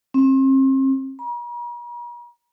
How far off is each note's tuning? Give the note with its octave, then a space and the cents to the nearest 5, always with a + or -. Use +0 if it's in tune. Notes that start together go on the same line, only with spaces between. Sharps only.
C4 +40
A#5 +45